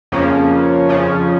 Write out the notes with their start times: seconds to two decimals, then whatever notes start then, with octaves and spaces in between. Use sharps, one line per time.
0.12 F2 C#3 F3 A#3 C#4
0.89 F2 C#3 F3 C#4